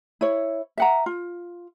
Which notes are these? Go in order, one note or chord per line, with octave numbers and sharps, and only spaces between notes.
E4 C#5
E5 F#5 A#5
F4